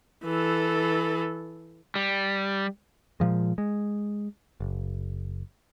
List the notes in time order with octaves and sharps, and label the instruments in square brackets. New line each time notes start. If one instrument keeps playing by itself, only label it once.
[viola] E3 A4
[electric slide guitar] G3
[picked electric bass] A#2 F3 G#3
G#3
F#1